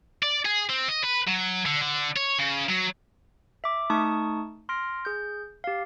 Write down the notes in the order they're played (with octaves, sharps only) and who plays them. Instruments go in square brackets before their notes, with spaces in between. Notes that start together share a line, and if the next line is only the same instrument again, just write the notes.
[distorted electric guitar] D5
G#4
C4
D#5
B4
F#3
D3
D3
C#5
C#3
F#3
[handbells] E5 D6
A3 D#4 A5 C#6 D#6
C6 F6 A#6 D7
G#4 G6
G4 F5